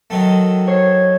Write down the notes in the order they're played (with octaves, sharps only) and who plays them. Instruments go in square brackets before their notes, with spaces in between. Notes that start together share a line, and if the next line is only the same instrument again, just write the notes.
[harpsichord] D#3 F#3 A3
[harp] C#5 C7